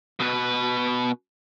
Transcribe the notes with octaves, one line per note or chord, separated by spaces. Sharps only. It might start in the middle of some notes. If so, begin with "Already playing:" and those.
B2 B4